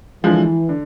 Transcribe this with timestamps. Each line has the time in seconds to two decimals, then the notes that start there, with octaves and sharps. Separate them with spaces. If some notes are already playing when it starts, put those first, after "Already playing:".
0.24 D3 E3 F3 G#3
0.69 D3